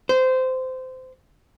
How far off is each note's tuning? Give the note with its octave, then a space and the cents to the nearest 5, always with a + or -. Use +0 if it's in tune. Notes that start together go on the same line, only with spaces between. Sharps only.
C5 -20